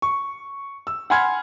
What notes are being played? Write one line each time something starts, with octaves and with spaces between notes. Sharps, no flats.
C#6
E6
F#5 G#5 B5 C6 F6 G#6